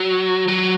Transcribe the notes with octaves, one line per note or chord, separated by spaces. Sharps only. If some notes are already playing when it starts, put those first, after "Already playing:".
Already playing: F#3
F#3